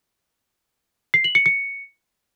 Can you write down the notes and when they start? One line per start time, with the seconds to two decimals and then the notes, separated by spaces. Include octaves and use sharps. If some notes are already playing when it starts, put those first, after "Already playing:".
1.14 C7
1.24 F#7
1.35 C#7
1.46 C#7